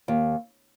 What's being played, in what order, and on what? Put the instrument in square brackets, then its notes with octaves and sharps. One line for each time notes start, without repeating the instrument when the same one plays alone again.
[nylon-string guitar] D#2